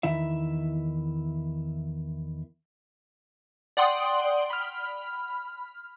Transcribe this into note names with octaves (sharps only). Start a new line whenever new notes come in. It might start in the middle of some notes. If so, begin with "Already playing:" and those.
E2 D#3 E4 E5
D5 F#5 G5 C6 D#6
B5 F6